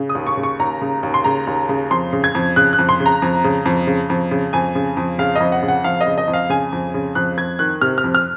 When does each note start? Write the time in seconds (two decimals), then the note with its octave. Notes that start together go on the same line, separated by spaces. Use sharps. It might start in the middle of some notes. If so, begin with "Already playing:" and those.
Already playing: C#3
0.09 D#6
0.15 D#2
0.27 C#6
0.37 C#3
0.43 C#6
0.60 D#2 A#5
0.82 C#3
1.03 D#2
1.14 C6
1.24 C#3 A#5
1.47 D#2
1.69 C#3
1.91 F2 C6
2.13 C#3
2.24 G#6
2.35 F2
2.56 C#3 F#6
2.73 F#6
2.78 F2
2.89 C6
3.00 C#3
3.06 A#5
3.22 F2
3.44 C#3
3.65 F2
3.87 C#3
4.10 F2
4.31 C#3
4.53 F2 G#5
4.75 C#3
4.97 F2
5.19 C#3 F5
5.35 F2 D#5
5.52 F#5
5.63 C#3
5.68 F#5
5.84 F2 F5
6.01 D#5
6.07 C#3
6.18 D#5
6.28 F2
6.33 F5
6.50 C#3 G#5
6.73 F2
6.94 C#3
7.15 F2 F#6
7.37 F2 G#6
7.59 D#3 F#6
7.81 C3 F6
7.98 F6
8.04 F2
8.15 F6